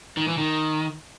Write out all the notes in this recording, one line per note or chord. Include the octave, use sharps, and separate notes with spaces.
D#3
E3
D#3